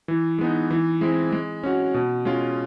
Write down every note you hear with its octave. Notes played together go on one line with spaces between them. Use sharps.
E3
G#3 B3 D#4
E3
G#3 C4 E4
G#3
C#4 F#4
B2
G#3 C#4 F4